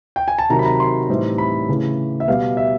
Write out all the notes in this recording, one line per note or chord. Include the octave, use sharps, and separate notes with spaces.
G5
G#5
A5
C3 D#3 F#3 A#5
B5
A#5
C6
A2 E3 G3 C4 D#4
B5
C#3 E3 A3
E5
B2 G3 B3 F5
E5